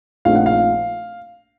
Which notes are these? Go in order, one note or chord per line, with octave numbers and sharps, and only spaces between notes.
A#1 A#2 A3 C4 D#4 F5
F#5
F5